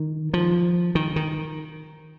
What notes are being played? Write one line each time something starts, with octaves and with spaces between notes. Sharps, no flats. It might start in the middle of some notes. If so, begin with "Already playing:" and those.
Already playing: D#3
F3
D#3
D#3